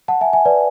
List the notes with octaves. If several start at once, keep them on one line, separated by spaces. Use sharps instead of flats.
F#5 A5
E5 G#5
E5 G#5
B4 D5